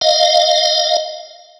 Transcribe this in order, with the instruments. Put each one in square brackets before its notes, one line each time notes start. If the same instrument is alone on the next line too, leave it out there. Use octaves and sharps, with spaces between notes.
[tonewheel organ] D#5 F5